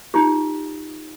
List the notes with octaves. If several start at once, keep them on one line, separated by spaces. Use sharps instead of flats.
D#4 F4 G4